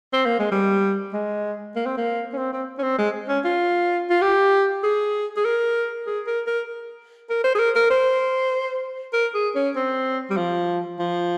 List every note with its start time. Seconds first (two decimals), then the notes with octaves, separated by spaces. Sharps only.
0.13 C4
0.26 A#3
0.39 G#3
0.52 G3
1.13 G#3
1.76 A#3
1.86 C4
1.97 A#3
2.33 C#4
2.37 C4
2.53 C4
2.78 C#4
2.83 C4
2.98 G#3
3.29 C#4
3.44 F4
4.10 F4
4.22 G4
4.84 G#4
5.37 G#4
5.45 A#4
6.07 G#4
6.27 A#4
6.47 A#4
7.30 A#4
7.44 C5
7.55 G#4
7.59 A#4
7.76 A#4
7.90 C5
9.13 A#4
9.34 G#4
9.56 C#4
9.76 C4
10.30 G3
10.37 F3
10.99 F3